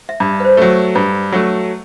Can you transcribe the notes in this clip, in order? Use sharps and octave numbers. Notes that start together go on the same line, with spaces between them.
E5
G2 D5
B4
C5
F#3 A3
G2 B4
F#3 A3